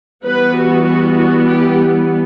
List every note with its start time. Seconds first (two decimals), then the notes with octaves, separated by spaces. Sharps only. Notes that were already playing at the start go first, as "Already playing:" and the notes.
0.24 E3 G3 B3 B4
0.55 F#4
0.85 F#4
1.16 F#4
1.47 G4